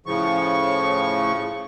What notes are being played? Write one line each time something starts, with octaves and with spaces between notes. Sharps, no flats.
A2 C#3 F3 C#6